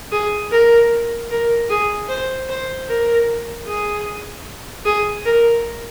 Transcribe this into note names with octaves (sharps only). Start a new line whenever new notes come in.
G#4
A#4
A#4
G#4
C5
C5
A#4
G#4
G#4
A#4